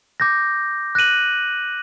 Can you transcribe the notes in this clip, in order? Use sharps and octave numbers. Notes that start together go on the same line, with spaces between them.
D6 G6 A#6
F#6 A#6 D#7 F#7